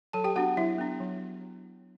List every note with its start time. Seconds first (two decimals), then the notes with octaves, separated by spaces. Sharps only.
0.13 F#3 A4 A5
0.24 G4 G5
0.36 B3 D4 F#4 F#5
0.57 F#3 E4 E5
0.78 B3 D4
1.00 F#3